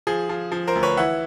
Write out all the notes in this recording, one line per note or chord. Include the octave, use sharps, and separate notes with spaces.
F3 G#4
F3
F3
A#4 C5
D2
B4 C#5
E3 E5 F#5